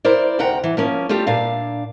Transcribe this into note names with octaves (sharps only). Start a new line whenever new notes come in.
E4 A#4 C5 D5
D2 C3 F#5 G5 A#5
E3
F3 A#3 C#4
G3 A3 F4 G4
A#2 D4 F5